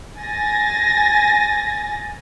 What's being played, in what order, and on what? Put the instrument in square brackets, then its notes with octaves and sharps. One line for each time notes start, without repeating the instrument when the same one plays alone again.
[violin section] G#5 A6 A#6